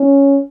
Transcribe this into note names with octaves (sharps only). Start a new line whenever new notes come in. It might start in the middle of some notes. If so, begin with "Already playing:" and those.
Already playing: C#4